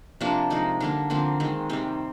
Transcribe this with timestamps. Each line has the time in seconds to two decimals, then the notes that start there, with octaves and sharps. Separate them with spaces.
0.21 C3 F3 A#3 D4
0.50 C3 F3 G#3 D#4
0.80 D3 G3 A#3 D4
1.10 D3 F3 A#3 C4
1.40 D#3 G#3 C4
1.70 C3 D#3 G3 C4